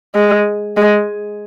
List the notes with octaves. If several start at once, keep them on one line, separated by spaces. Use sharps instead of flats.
G#3
G#3